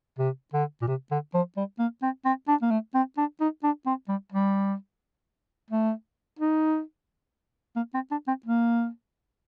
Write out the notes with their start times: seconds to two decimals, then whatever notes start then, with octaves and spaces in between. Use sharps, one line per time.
0.19 C3
0.53 D3
0.82 A#2
0.88 C3
1.11 D3
1.34 F3
1.57 G3
1.79 A#3
2.03 C4
2.25 C4
2.48 D4
2.62 A#3
2.71 A3
2.95 C4
3.18 D4
3.41 D#4
3.64 D4
3.86 C4
4.09 G3
4.33 G3
5.71 A3
6.39 D#4
7.76 A#3
7.94 C4
8.11 D4
8.28 C4
8.46 A#3